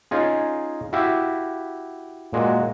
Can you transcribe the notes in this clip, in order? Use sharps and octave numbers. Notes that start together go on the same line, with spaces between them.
C#4 D#4 F4 G#4
E4 F#4 G4 E5 F5
A#2 G#3 F#4